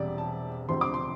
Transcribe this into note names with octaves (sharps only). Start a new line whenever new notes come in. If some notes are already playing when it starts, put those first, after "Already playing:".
Already playing: E1 E2 C3 G3 D5
A5
E1 D2 C3 F3 C4 C6
D6
C6